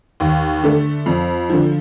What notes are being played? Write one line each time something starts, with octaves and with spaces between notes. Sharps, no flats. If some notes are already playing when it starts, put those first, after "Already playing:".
D#2
D3 A3
F2
D3 F3